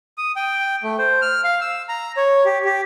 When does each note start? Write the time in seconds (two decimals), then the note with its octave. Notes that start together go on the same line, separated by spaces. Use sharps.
0.18 D#6
0.36 G5
0.83 A3
0.99 C5
1.22 F6
1.44 F5
1.61 E6
1.89 A#5
2.17 C#5
2.45 G4
2.65 G4